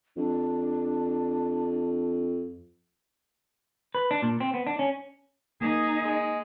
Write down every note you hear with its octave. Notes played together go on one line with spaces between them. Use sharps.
F2 D4
B4
D4
A#2
C4
B3
D4
C#4
A#3 D#4 G#4
G#3